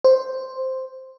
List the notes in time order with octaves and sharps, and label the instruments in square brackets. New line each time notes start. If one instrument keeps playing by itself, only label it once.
[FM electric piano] C5